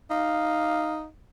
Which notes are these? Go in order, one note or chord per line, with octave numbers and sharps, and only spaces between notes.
D#4 F5